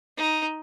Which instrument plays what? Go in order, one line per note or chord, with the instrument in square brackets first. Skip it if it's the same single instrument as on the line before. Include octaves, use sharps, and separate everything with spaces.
[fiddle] D#4